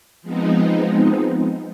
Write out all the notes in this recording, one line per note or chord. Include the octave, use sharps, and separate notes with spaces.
F3 G#3 B3 C4 D#4